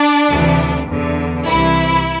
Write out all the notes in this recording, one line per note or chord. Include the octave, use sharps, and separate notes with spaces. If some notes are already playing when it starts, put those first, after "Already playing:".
Already playing: D4
D2 C3 E3
E2 D3
C2 C3 E3 E4